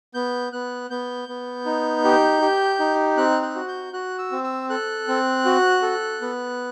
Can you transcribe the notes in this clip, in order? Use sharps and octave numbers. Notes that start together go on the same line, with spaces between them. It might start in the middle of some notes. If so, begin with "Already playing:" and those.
B3 G6
B3 F#6
B3 G6
B3
D#4
G4
G4
D#4
C4 F#6
F#6
F#4
G6
F#4 F#6
E6
C4
E6
A4 F#6
C4
F#4
A4
B3